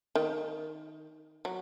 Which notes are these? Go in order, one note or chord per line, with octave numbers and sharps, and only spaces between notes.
D#3
F#3